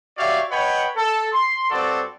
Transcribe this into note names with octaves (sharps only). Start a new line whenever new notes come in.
F#4 G4 C#5 D5 E5 F5
B4 C#5 D#5 F#5 G5 B5
A4
C6
G2 C4 F#4 A4 D5